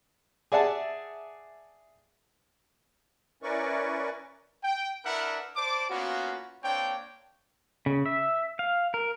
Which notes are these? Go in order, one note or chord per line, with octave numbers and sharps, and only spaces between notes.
G#4 D5 E5 F#5 A5
C#4 E4 A#4 B4 D5 C#6
G5
D4 E4 A#4 B4 E5 F#5
C5 D5 A5 D6
A#3 B3 C#4 F4 F#4
A#3 C4 D4 C#5 G5
C#3
E5
F5
A#4